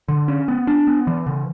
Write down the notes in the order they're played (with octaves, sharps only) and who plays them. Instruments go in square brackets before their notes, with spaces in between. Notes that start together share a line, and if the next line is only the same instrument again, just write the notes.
[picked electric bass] D3
C#4
B3
D4
B3
E3
C#3